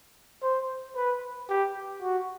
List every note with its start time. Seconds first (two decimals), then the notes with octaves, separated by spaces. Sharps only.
0.43 C5
0.96 B4
1.49 G4
2.02 F#4